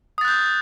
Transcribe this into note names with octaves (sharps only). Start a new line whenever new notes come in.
D#6 F#6 G6 A6